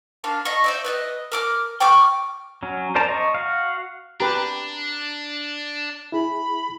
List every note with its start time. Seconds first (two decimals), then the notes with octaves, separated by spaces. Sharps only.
0.24 A#3 D4 F5 C6
0.45 D#5 F5 B5 C#6
0.64 C5 D5 E5
0.84 B4 D5 D#5
1.32 A#4 D6 F6
1.80 G5 C#6 D6 F6
2.63 F#3 C#4
2.95 A#4 C5 D5 A5 A#5
3.09 D#5 C#6
3.35 F#4 F5
4.20 D4 G4 B4 A#5
6.12 E4 G#4 B5